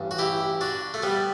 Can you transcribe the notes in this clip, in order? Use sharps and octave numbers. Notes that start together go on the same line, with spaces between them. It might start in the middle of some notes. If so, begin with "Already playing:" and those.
Already playing: A1 G2
F#4
E4 G4
D4 F#4
A3
G3 B3